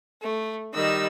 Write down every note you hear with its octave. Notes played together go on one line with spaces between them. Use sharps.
A3
D#3 G3 D#5 E6